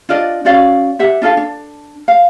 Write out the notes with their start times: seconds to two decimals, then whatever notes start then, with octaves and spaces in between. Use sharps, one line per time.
0.09 D4 F4 D5 D#5
0.45 C#4 F#4 D5 F5
0.99 G4 E5 F#5
1.22 D4 F4 A4 F5
1.37 D4
2.08 F5